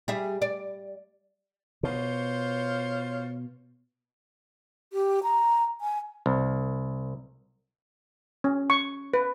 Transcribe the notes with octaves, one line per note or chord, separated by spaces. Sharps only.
G3 G#4 E5
D5
B2 F4 C5 C#5
G4
A#5
G#5
C2
C#4
C#6
B4